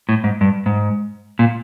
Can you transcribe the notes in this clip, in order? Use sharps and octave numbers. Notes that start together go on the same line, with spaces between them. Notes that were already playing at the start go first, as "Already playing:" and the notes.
A2
G#2
G2
G#2
A#2